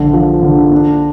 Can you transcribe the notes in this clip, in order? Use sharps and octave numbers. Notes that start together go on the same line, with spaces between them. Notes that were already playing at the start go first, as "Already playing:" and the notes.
Already playing: A#1 D3
F3
D3
D4